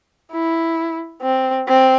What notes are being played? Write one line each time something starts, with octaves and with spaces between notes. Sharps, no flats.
E4
C4
C4